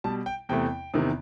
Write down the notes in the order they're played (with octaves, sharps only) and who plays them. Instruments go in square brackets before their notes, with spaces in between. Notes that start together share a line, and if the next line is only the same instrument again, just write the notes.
[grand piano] B2 G3 A5
G5
E2 C3 E3 A3 G5
E2 C3 D#3